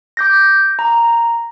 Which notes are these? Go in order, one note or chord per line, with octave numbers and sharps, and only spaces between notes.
D6 G6 A#6
A#5